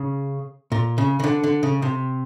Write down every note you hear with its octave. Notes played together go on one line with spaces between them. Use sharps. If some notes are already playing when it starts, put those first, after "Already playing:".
Already playing: C#3
A#2
C#3
C#3
D3
D3
C#3
C3